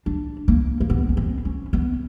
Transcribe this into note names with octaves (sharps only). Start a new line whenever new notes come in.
D4
A#3
A#3
B3
C#4
C4
C#4
B3